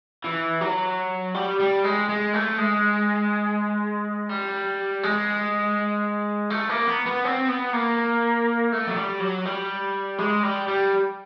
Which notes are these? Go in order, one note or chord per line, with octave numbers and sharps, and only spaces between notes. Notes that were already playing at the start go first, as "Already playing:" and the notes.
E3
F#3
G3
G3
G#3
G#3
A3
G#3
G3
G#3
A3
A#3
B3
B3
C4
B3
A#3
A3
F#3
G3
F#3
G3
G#3
G3
G3